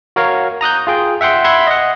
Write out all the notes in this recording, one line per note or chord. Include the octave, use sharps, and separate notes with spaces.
F#4 A#4 C#5 F5
A#5 D#6 F#6 G6
F4 G#4 G5
E5 F#5 G5 C6
E5 F#5 B5 C6 F#6 G#6
D#5 F#5